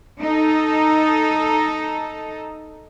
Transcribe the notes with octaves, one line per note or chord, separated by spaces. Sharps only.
D#4 A4